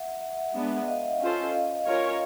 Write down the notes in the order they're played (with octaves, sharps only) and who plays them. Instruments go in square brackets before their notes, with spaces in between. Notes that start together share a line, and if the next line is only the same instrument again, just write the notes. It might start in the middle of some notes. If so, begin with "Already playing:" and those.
Already playing: [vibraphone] E5 F#5
E5 F#5
[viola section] G#3 B3 D4
[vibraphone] D#5 F5
[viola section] C#4 F4 A4 C5
[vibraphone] D#5 F5
[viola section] C#4 F4 A#4 C#5